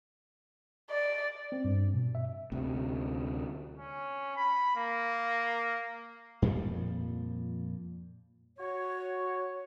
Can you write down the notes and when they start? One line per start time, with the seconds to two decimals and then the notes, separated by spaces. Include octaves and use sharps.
0.90 D5
1.52 C4
1.65 G2
1.94 B2
2.15 E5
2.52 D2 C3
3.77 C#4
4.36 B5
4.76 A#3
6.42 F2 A#2 F3 G3
8.58 F#4 C#5